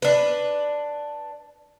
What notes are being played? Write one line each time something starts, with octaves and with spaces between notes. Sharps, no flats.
D4 B4